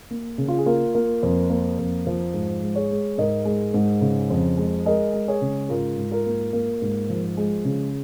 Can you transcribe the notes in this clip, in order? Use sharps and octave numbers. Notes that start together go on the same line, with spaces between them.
A#3
C#3
F4
G#4
A#3 F4 A#4
A#3
F2
A#3
F2
F3
G#2
G#3
G#4 C#5
G#3
G#2 A#4 D#5
G#3
G#2
C#3
F2
G#3
G#3 A#4 D#5
G#3
G#4 C#5
C#3
G#2 F4 A#4
G#2
F4 A#4
A#3
A#3
G#2
F3
G#3
C#3